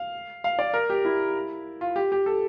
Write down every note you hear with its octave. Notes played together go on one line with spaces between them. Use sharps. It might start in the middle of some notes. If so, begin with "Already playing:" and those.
Already playing: F5
F5
D5
A#4
G4
E4
F4
G4
G4
A4